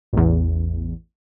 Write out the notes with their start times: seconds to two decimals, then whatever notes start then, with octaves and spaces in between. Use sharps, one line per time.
0.13 A1 E2